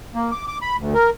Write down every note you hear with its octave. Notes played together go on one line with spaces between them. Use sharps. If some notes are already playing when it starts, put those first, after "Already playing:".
A#3
D6
D6
B5
D2
A#4